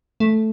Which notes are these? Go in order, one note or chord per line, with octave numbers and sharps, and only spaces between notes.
A3